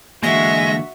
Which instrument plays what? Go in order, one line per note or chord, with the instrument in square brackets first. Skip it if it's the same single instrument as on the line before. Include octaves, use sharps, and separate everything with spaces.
[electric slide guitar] D3 E3 A#3 [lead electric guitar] G#3 [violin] F#4 E5 [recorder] A#6